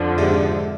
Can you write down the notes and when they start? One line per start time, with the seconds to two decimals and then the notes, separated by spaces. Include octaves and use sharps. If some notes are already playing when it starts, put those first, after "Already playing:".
Already playing: F2 D3 F3
0.18 G#2 C3